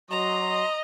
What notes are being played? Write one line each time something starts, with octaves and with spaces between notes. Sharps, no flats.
F#3 D#5 A#5 C6
D#5